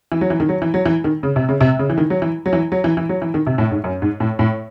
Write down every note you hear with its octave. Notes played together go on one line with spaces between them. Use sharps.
E3
F#3
E3
D#3
F#3
E3
F#3
E3
D#3
C#3
C3
C#3
C3
C#3
E3
D#3
F#3
E3
F#3
E3
F#3
E3
E3
F#3
E3
D#3
C3
A2
G#2
F#2
G#2
A2
A2